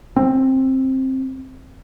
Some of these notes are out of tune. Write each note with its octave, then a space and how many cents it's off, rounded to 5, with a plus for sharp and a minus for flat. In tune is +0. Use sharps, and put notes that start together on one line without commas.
C4 +15